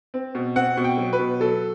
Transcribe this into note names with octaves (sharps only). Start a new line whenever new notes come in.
C4
B2
C4 F#5
B2
G5
F#3
B4
B2
F#3 A4